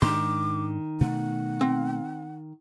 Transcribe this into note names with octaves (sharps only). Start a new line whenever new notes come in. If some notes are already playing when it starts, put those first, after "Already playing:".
G#2 D#3 D4 C6 D6
B2 A3 F#5
C4